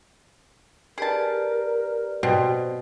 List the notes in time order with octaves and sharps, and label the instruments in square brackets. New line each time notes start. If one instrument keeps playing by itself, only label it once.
[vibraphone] G4 B4 D5 [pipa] G#4 A5 [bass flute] A#4
[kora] B2 [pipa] C4